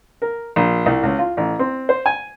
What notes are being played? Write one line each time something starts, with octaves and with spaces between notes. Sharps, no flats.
A#4
A#1
C2
C#2
F4
A1
C4
C5
G#5